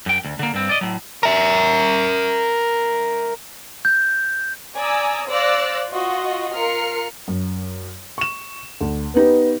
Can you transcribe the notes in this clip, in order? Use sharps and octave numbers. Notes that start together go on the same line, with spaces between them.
F#2 G5
D2
D3 A#3
G2 C4
D5 D#5
A2 F#3
A#4 E5
G6
D5 G#5 A#5 D#6 E6
C5 D5 F5 E6 F#6 A#6
F4 F#4 D#5
F4 A#4 F6 C7 C#7
F#2
C#6 E7
D2
B3 D#4 G4 B4